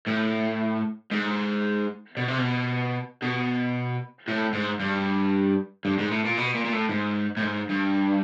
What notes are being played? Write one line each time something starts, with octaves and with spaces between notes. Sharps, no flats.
A2
G#2
B2
C3
B2
B2
A2
G#2
G2
G2
G#2
A2
A#2
B2
A#2
A#2
A2
G#2
A2
G#2
G2